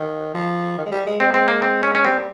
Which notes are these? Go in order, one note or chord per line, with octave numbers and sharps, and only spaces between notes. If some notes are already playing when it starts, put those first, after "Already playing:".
Already playing: D#3
F3
D#3
G#3
G3
G#3
G#3 C4
C4
A#3
C4
C#4
C#4
G3 C4